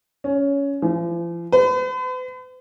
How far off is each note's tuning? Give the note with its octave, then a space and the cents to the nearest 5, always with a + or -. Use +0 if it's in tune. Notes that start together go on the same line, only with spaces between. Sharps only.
C#4 +15
F3 -45
B4 +45